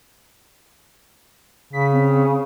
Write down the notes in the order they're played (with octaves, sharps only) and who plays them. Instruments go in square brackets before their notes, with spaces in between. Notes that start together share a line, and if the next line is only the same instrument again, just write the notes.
[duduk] C#3 [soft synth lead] B6
[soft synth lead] C4